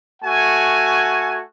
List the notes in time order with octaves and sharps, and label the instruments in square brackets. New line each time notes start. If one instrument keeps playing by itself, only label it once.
[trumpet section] A3 F#4 F#5 G#5